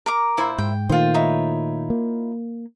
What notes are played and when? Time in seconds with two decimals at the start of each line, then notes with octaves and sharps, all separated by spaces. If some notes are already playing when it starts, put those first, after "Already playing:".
0.06 A#4 A#5 D6
0.37 A#2 E4 C5
0.58 G#2 G5
0.89 A#2 D#3 A3 F4 C5
1.14 D#4 E4 C#5
1.90 A#3